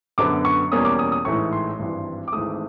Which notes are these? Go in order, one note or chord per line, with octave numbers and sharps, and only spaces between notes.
F#2 D3 F#3 B3 D6
C#6
E2 B2 G3 A#3 C#4 D#6
D6
D#6
D#6
A1 G#2 E3 A3 C#6
C6
G#1 G2 E3
D6
G#1 G#2 E3 A3 D#6